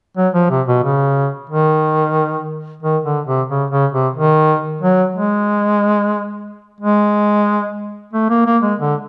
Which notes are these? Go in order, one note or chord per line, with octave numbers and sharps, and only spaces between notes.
F#3
F3
C3
B2
C#3
D#3
D#3
D3
C3
C#3
C#3
C3
D#3
F#3
G#3
G#3
A3
A#3
A#3
G#3
D3